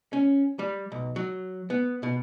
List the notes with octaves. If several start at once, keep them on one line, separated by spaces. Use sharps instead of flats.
C#4
G3
B1
F#3
B3
B2